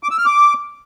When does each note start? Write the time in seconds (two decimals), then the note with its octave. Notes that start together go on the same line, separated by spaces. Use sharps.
0.03 D6
0.11 E6
0.18 F6
0.26 D6